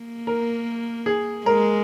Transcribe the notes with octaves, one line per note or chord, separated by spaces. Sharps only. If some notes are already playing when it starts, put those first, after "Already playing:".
Already playing: A#3
A#4
G#4
G#3 A#4